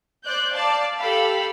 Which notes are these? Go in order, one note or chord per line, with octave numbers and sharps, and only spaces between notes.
C5 D5 F#6 G6
D5 F5 A5
G4 A4 F5 B5 E6